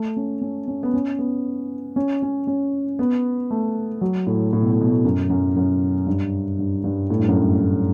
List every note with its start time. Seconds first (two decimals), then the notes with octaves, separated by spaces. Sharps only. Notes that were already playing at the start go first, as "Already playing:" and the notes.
Already playing: A3
0.17 C#4
0.42 C#4
0.68 C#4
0.83 B3
0.94 C#4
1.19 B3
1.96 C#4
2.22 C#4
2.47 C#4
2.99 B3
3.51 A3
4.01 F#3
4.27 A2
4.53 A2
4.62 B2
4.72 A2
4.81 B2
4.90 A2
5.04 F#2
5.30 F#2
5.56 F#2
6.07 G2
6.59 G2
6.84 G2
7.10 A2
7.19 G2
7.28 F#2
7.38 G2
7.61 A2